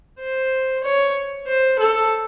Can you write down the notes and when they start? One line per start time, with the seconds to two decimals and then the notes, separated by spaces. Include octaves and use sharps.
0.20 C5
0.84 C#5
1.47 C5
1.79 A4